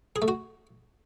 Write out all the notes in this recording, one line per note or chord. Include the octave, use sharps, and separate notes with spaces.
G#4
A3
F#4